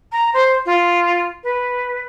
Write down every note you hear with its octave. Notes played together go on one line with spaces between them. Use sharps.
A#5
C5
F4
B4